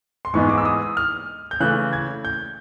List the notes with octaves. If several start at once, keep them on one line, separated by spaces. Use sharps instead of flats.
C6
G#2 E3 G#3 B3 D#4 C#6
D6
E6
D#6
F6
G6
C#3 E3 A3 F#6
G#6
G6